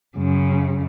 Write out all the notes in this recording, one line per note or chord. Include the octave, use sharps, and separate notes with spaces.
F#2 C#3